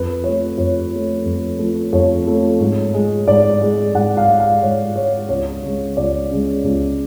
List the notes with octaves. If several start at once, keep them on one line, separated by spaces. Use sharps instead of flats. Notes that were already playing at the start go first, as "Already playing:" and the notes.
Already playing: F2 B4
F3 A3 C#5
F2 C#5
F3 A3
F2
F3 A3
F2 C#5
F3 A3
G#2
G#3
G#2 D5
G#3
G#2 F#5
F5
G#3
F5
G#2 C#5
G#3 C#5
C#2 C#5
C#3 G#3
C#2 D5
C#3 G#3
C#2